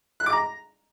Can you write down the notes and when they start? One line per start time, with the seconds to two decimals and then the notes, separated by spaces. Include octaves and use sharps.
0.20 F#6
0.26 D6
0.32 A#5